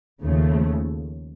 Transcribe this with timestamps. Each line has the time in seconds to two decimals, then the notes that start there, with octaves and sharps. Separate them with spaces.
0.22 D#2 C#3 F3 A3